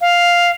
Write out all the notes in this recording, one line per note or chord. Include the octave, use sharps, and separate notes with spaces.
F5